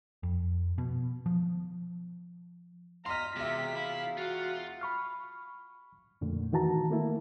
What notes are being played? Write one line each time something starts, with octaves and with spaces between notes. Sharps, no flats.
F2
B2
F3
D#5 F5 A#5 C6 F6 B6
E1 C3 F4 E5 B6
E4 F5
F4 F#4 F#5
B5 C#6 F6
F2 A#2 D3 A3
D#3 E3 F#4 A5 A#5
A3 A#3 E4